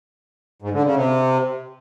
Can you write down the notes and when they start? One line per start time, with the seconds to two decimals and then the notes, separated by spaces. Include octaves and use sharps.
0.62 G#2
0.73 D3
0.84 C#3
0.95 C3